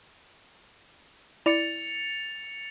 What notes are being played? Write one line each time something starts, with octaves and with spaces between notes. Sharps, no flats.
E4 D5 D6 A6 C#7 F7